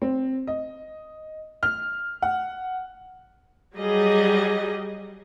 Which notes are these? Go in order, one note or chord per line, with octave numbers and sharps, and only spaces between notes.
C4
D#5
F6
F#5
F#3 G3 G4 G#4 D#5